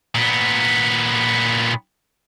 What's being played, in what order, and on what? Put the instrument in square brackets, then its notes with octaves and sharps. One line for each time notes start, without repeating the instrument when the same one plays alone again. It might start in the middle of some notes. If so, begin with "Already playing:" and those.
[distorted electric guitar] A#2 B3